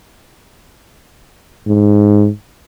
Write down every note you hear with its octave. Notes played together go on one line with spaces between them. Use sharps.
G#2